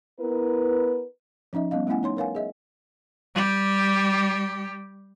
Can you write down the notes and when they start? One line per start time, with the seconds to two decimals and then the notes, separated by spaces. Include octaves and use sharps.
0.19 B3 E4 A#4 B4
1.53 F3 C#4 D#4 D#5 E5
1.71 G3 B3 C#4 D#5 F5
1.87 A3 B3 C#4 E4 F#5 G#5
2.03 D#4 C#5 C6
2.17 A#4 B4 C#5 F5 F#5 G#5
2.35 G#4 D#5 E5
3.35 G3 G4